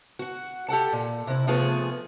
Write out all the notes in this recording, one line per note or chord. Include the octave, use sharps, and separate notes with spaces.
F#4 F#5
G4 A4 F#5 A5
A#2
C3 E4
C3 F3 A3 B3 F4 G#4